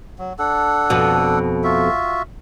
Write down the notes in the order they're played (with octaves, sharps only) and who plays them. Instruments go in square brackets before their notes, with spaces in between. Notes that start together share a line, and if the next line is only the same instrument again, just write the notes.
[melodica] F#3
D4 A4 F#5
[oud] F2 B2
[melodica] F4 F#4 E5